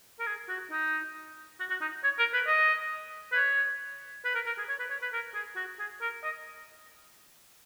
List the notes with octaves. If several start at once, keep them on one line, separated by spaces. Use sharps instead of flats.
A#4
G#4
F#4
D#4
F#4
F#4
D#4
C#5
A#4
B4
D#5
B4
C#5
B4
A#4
A#4
G#4
C#5
B4
C#5
B4
A#4
G#4
F#4
G#4
A#4
D#5